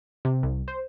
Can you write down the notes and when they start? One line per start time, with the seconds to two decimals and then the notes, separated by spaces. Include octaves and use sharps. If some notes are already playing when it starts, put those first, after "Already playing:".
0.25 C3
0.43 C2
0.68 C5